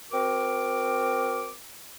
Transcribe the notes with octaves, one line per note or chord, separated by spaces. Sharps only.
C4 F#4 A#4 D6